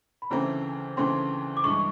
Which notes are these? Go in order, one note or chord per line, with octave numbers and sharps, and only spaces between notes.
B5
D2 C#3 E3 A3 C4 A#5
D2 C#3 E3 A3 C4 C6
D6
G2 E3 G#3 C#6